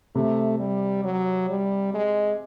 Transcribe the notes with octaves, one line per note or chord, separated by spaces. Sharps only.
C3 A3
G3
F#3
G3
G#3